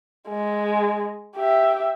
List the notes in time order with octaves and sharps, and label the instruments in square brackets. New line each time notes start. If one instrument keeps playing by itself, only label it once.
[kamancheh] G#3
G4 E5